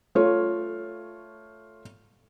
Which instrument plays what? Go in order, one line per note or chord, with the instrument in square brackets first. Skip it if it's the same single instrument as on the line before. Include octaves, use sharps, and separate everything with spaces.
[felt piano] A3 F4 C#5